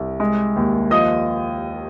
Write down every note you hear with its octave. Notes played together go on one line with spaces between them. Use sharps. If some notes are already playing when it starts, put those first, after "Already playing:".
Already playing: C2
G#3
D#2
F3 D#5 D#6